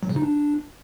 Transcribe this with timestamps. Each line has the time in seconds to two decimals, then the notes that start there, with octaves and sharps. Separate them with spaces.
0.03 F#3
0.09 C#3
0.16 D#4
0.23 D4